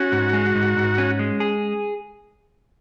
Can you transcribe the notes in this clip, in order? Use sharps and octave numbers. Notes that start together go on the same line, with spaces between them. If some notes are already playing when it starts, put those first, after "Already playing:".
Already playing: C#4 F#4
G#2
G#3
G#2
G#2
C#4
G#3
G#4